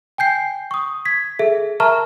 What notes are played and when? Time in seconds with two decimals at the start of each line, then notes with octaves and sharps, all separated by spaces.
0.18 G5 G#5 G6 C7
0.71 C#6 D#6
1.05 G#6 B6
1.39 G#4 A4 E5
1.80 A#4 E5 A5 A#5 C#6 F6